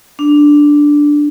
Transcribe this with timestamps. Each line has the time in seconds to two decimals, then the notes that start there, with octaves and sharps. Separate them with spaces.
0.19 D4